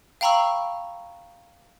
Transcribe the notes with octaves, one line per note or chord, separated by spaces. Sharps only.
F5 G5 A#5 B5 C#6 E6